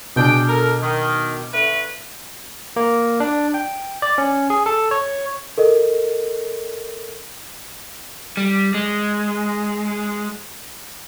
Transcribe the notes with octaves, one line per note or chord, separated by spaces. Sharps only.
B2 D4 G#4 G5
A4 A#4
D#3
D3 A3 B4
A#3
D4
G5
D5
C#4
G#4
A4
C#5
A4 A#4 D#5
G3
G#3